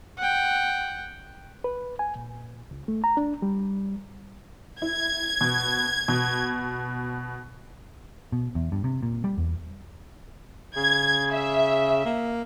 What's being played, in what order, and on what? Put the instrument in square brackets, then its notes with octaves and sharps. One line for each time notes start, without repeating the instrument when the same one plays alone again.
[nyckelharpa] F#5 G5
[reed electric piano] B4
G#5
A#2
C#2
A3
A#5
D4
G3
[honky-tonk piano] E4 [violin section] G#6
[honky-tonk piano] B2
B2
[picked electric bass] B2
E2
G2
C3
A#2
G3
E2
[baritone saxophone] C#3 [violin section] G#6
[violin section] E5
[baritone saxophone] A#3